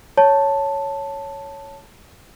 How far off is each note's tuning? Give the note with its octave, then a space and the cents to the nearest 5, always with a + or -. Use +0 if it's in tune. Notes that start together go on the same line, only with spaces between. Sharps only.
C#5 +0 A5 +5